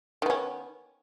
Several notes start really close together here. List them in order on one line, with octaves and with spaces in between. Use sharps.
D#3 B3 C#4